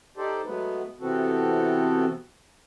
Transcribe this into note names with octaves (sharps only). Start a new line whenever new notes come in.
D#4 G4 A4 C5 D5
F#3 G#3 A3 B3 B4
C3 E3 B3 C4 F#4 A4